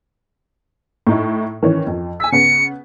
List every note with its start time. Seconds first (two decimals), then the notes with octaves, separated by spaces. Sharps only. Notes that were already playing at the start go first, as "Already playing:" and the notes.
1.07 A2 D#4 E4
1.63 D#3 E3 C#4
1.87 F2
2.20 G#5 E6 B6
2.32 C#3 B3 C#7